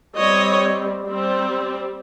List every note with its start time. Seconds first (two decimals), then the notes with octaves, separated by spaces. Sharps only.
0.16 G3 C4 C#5 D#5
1.06 G3 C4